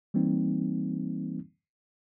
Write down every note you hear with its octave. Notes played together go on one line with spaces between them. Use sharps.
E3 G3 A#3 C4 D#4